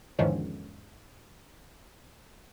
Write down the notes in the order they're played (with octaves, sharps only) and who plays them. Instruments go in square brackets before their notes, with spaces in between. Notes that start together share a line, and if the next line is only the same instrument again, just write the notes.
[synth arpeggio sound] E2 G#2 D3 D#3 F3 C#4